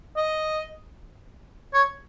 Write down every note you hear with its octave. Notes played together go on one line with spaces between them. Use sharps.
D#5
C#5